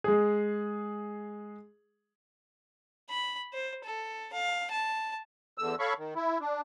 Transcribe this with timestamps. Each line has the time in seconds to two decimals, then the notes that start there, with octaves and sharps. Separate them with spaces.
0.04 G#3 G#4
3.10 B5
3.53 C5
3.85 A4
4.33 F5
4.71 A5
5.58 E2 D3 E6
5.79 A4 C#5 F5 B5 C#6
5.98 D#3
6.15 E4
6.40 D4